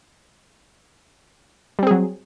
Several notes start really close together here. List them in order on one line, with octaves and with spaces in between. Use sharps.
G3 C4 G#4 F#3